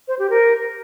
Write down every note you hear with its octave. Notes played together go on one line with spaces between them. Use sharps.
C5
G4
A#4